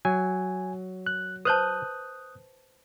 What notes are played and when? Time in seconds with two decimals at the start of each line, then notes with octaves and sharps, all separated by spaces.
0.05 F#3 G#5
1.07 F#6
1.45 B4 C5 A5 D#6 F#6 G6